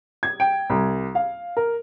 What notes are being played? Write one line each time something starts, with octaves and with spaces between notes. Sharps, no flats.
G#6
G5
C2
F5
A#4